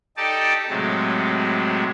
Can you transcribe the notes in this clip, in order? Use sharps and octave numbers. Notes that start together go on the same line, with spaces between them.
D#4 G4 A4 D5 D#5 A5
A2 C3 F#3 G#3